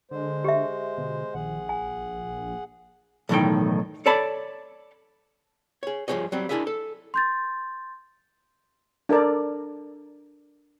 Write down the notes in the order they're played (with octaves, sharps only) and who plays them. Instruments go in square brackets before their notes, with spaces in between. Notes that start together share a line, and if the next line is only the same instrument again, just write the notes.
[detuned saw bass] D3 [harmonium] G#3 C5
[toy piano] G4 E5
[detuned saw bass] B2 [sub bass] D3
[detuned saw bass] A#1 [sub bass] D#3 [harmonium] G#4 F#5
[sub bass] G#1 [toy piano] G#5
[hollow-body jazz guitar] B1 E2 A2 D#3 D#4 G5
A4 C#5 D5 A5 B5
G#4 C#5
G2 F3 D#4 G#4 C#5 D#5
F#3 G3 C4
D4 E4 G#4 A#4 D#5 E5
A4
[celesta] C6 G6 A6
[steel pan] D4 A4 A#4 D5